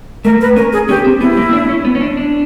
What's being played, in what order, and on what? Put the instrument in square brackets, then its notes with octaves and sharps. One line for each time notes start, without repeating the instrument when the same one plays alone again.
[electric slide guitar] A3 [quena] A#4
[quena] B4
[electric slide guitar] C#4 [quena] A#4
[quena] G#4
[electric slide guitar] C#4 [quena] G4
[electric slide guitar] C4
[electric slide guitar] B3 [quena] E4
[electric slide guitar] A#3
D4
C#4
B3
C#4
D4
D4